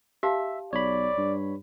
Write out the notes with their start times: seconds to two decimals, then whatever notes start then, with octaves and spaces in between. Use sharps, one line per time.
0.23 G4 E5 F5 A5
0.73 B1 C#5 D5 B5
1.18 G2